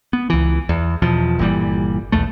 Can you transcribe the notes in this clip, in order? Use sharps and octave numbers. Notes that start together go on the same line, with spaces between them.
B3
C#2 E3
E2
E2 B2 F3
G1 A#2 E3 G3
D#1 B1 E2 A3